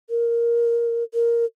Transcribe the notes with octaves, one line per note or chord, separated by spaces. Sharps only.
A#4
A#4